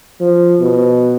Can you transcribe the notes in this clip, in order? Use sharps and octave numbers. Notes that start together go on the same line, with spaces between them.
F3
B2